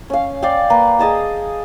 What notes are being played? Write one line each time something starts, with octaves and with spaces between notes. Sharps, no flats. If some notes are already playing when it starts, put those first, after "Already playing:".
C#4 F5
D5 F5 G5
A#3 A#4 B4
G#4 D#5 A5 A#5